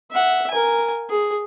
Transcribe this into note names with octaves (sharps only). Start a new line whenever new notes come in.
E5 F#5
A#4 G#5
G#4